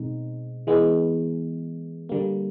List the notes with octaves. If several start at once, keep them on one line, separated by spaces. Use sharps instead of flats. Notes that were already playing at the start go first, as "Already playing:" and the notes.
Already playing: B2 G#3 C4 D#4
E3 G#3 B3
D3 G3 A#3